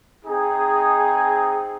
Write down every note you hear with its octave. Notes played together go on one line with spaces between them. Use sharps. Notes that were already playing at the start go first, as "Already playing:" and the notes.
C4 D#4 G#4